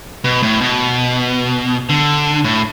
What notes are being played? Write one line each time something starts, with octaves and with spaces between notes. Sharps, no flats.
B2
A2
B2
D3
A2